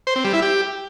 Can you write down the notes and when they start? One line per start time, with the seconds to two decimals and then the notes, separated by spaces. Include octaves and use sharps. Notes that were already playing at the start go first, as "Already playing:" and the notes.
0.07 C5
0.16 C4
0.24 G3
0.33 E4
0.42 G4